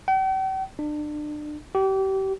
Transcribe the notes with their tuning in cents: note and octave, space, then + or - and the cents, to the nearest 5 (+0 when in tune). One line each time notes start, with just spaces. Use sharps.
G5 -45
D4 +30
G4 -30